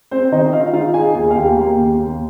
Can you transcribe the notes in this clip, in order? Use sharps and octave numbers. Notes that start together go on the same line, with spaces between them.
C4 C5
D#3 D#4 D#5
D#4 F4 F5
D#4 F4 F5
D#4 G#4 G#5
D#2 G#4 G#5
F5
D#2 G4 G5
A#3
D#2
D#2